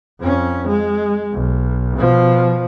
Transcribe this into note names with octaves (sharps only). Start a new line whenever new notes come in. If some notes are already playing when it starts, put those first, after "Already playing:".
F2 C#4
G#3
B1
B2 F3